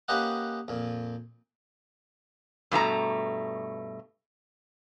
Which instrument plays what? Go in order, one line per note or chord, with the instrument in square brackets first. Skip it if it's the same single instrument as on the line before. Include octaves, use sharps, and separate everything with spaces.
[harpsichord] A#3 C#4 G4 B4 D#5 F#5
F2 A#2
[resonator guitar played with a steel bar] G2 B2 A3 A#5